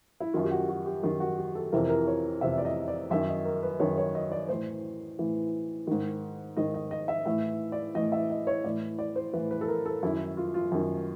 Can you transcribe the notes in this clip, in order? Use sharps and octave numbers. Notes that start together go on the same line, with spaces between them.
E4
F#2 D#3 F4
G4
F#4
F#4
G4
F#2 D#3
F#4
G4
A4
F2 C3 E3 A#4
A#4
C#5
F2 C3 E3 E5
D5
D#5
D5
F#2 D#3 E5
D#5
A#4
B4
F#2 D#3 C#5
C#5
D#5
D5
A2 E3 C5
A2 E3
G#2 D#3
G#2 D#3 D#5
D#5
D#5
E5
A2 E3 E5
D5
A2 E3 D#5
E5
D#5
C#5
A2 E3 D5
D5
C5
A2 E3 B4
B4
A4
A#4
A4
F#2 D#3 E4
F4
F4
F#2 D#3